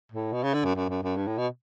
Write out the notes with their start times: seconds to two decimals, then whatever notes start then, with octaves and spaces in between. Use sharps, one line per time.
0.12 A2
0.33 B2
0.43 C#3
0.54 D3
0.65 F#2
0.75 F#2
0.90 F#2
1.04 F#2
1.17 G2
1.28 A2
1.38 B2